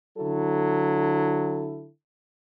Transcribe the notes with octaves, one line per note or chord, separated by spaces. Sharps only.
D3 F#3 E4 A4